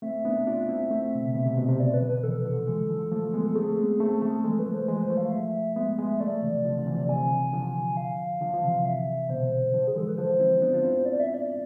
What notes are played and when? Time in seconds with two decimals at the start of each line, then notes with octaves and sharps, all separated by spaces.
0.02 A3 C4 E5
0.25 B3 D4
0.47 D4 F4
0.69 C4 E4
0.91 A3 C4
1.15 B2
1.25 C3
1.35 B2 D3
1.46 C3
1.57 B2
1.68 C3
1.79 B2 D3 D5
1.94 B4
2.01 D3 F3
2.08 B4
2.23 C3 E3 A4
2.45 D3 F3
2.67 E3 G#3
2.89 D3 F3
3.12 F3 A3
3.34 G#3 B3
3.46 A4
3.55 A3 C4 G#4
3.78 G#3 B3
4.00 A3 C4
4.22 F3 A3
4.44 E3 G#3 A4
4.59 B4
4.66 F3 A3
4.74 C5
4.88 E3 G#3 B4
5.03 C5
5.10 F3 A3
5.17 F5
5.32 E5
5.76 G#3 B3 E5
5.98 G#3 B3
6.20 F3 A3 D5
6.42 C3 E3
6.65 D3 F3
6.79 D3
6.86 C3 E3
7.08 C3 E3 G#5
7.30 D3 F3
7.53 D3 F3
7.97 F5
8.41 D3 F3
8.54 F3
8.63 C3 E3
8.85 E5
9.29 B2 D3 C5
9.74 D3 F3
9.87 G#4
9.95 E3 G#3 A4
10.08 B4
10.17 D3 F3 C5
10.40 C4 E4
10.62 B3 D4
10.74 F4
10.84 C4 E4
11.05 D5
11.20 E5
11.34 D5